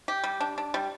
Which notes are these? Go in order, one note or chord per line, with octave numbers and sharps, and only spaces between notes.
G4
G3
D4
D4
G3